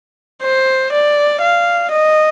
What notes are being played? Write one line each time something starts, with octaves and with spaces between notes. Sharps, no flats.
C5
D5
F5
D#5